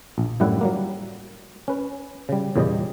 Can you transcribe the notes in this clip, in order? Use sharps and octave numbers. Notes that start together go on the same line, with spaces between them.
A#1
F#2 A2 G3 E4 F#5
F#3 G3 A#3
C#4 B4
C#3 G3
E2 A#2 C#3 G3 G4 D#5